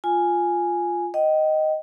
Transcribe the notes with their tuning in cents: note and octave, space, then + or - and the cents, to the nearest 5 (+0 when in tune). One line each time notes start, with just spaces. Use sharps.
F4 +0 G#5 +0
D#5 +0 G5 -30